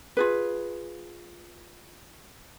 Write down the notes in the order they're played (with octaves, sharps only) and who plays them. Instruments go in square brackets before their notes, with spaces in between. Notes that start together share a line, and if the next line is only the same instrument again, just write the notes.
[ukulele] F4 G#4 B4